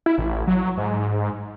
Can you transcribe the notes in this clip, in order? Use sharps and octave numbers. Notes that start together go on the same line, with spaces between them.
E4
A1
F#3
G#2